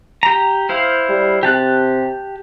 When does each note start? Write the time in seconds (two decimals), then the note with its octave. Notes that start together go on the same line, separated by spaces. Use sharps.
0.23 G4 A#5
0.69 E4 C5 F5
1.09 G3
1.43 C3 G4 A5 F#6